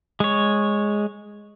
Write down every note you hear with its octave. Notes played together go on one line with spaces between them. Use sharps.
G#3 C#5